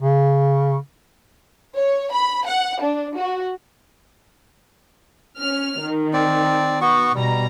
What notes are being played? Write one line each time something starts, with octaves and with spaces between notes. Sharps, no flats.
C#3
C#5
B5
F#5
D4
F#4
C#4 F6
D#3
C4 D5
B3 F#4 C#6
B2 G3 A#5